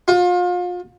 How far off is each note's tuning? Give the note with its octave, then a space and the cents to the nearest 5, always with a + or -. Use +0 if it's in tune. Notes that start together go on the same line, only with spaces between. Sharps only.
F4 +35